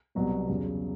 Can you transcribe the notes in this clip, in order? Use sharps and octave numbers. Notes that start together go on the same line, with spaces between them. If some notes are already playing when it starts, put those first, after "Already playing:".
C2 B2 F#3 B3
E2 C#3 F#3